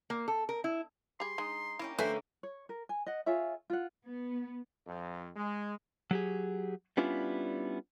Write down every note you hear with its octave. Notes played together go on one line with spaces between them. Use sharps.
A#3
A4
A#4
E4
G3 G#4 C6
G#3 D#4
A#3 C#4 E4 G4
D3 A3 A#3 C#4 B4 C5 E5 G#5
C#5
A#4
G#5
D#5 F#5
F4 G#4 C#5 E5
F4 F#5
B3
F2
G#3
F#3 G4 G#4
G3 B3 C#4 D4 E4 F4